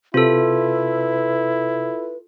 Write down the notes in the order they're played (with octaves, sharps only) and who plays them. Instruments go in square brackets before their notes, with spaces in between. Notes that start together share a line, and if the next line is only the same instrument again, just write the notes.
[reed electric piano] C3 [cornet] E4 [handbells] F4 A4 [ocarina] B4